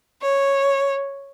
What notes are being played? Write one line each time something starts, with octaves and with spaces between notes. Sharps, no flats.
C#5